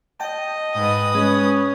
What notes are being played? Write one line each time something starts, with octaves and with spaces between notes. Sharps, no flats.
D#5 G5 A5
G#2 B4 D#6
G#3 C#4